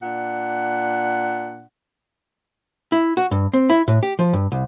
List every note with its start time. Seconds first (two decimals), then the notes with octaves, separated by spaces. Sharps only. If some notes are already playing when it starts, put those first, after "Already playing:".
0.03 A#2 D4 F#5
2.92 E4
3.17 F#4
3.31 G2
3.54 C4
3.70 E4
3.88 A2
4.03 G4
4.19 F3
4.33 G2
4.52 C2